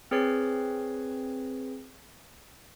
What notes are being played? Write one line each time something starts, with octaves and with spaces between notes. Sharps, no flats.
C4 G#4 B4 C#5 C7